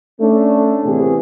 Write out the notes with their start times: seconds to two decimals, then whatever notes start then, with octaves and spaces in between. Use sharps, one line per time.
0.20 A3 C#4 D4
0.84 A2 C3 E3 A3 B3 G#4